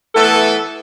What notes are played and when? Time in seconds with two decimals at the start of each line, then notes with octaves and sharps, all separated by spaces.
0.15 E3 A3 B3 A4